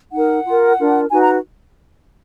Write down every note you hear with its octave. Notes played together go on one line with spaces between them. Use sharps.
D#4 A#4 F#5
F4 A#4
D4 F4 A#4
D#4 F#4 B4 G#5
A#5